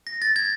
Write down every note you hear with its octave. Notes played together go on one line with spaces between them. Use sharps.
A#6
A6
G#6